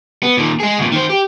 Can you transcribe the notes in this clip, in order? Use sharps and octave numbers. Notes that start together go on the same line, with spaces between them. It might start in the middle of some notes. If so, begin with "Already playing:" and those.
B3
A#2 D#3
G#3 G#4
D2 A#2
D#3 C5
G4